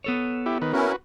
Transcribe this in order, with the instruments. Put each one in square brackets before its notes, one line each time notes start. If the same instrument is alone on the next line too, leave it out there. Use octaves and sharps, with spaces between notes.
[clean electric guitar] B3 A4 C#5
[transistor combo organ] E4 G4
D#3 B4
[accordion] C#4 E4 A#4 [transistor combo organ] F#4 B4